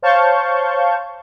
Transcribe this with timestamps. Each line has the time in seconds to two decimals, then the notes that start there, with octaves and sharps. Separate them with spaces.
0.02 C5 C#5 F5 A5 C#6 G6